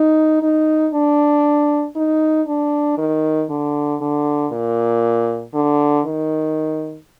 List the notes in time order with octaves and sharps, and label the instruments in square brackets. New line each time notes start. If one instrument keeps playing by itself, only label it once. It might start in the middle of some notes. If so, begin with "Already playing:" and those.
Already playing: [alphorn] D#4
D#4
D4
D#4
D4
D#3
D3
D3
A#2
D3
D#3